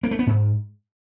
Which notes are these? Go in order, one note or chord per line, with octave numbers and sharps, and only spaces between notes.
A#3
A3
B3
G#2